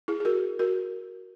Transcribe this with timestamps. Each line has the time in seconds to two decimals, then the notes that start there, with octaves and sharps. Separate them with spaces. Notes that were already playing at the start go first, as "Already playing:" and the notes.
0.08 E4 G#4
0.20 G#4
0.25 F#4 A#4
0.59 F#4 A#4